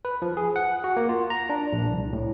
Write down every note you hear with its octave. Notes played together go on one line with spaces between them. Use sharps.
B4
F3
G#4
F#5
F#4
A#3
F4
A#5
D4
A#1
C2
A2